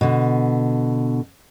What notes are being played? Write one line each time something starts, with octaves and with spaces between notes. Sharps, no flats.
B2 D3